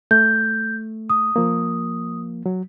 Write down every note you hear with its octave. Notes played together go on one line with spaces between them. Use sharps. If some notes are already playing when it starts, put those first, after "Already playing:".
A3 G6
D#6
F3 A#3
F#3